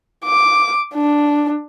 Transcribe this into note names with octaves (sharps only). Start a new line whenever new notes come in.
D6
D4